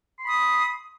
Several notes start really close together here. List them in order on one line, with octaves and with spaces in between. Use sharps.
C6 B5 D#6